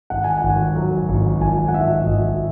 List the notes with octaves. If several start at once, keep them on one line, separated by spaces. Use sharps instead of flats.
G#1 F#5
G#5
F#5
G#1
F#3
G#1
G#1 G#5
F#5
G#1 E5
G#1 D#5